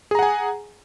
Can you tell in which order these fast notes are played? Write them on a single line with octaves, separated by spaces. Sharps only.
G#4 A#5 F#5 G#5